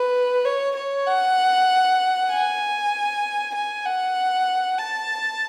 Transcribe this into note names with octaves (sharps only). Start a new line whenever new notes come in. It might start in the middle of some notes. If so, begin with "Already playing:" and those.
Already playing: B4
C#5
C#5
F#5
G#5
G#5
F#5
A5